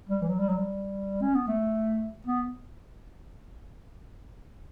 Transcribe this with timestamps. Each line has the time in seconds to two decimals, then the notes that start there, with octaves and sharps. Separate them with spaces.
0.09 G3
0.22 E3
0.29 F#3
0.39 G3
0.49 F#3
0.58 G3
1.22 C#4
1.35 B3
1.47 A3
2.27 B3